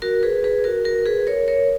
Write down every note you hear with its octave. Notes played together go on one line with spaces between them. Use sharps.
F#4 A#4
G#4 B4
G#4 B4
F#4 A#4
F#4 A#4
G#4 B4
A#4 C#5
A#4 C#5